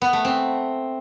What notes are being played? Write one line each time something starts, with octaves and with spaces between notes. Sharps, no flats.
B3
A3
C4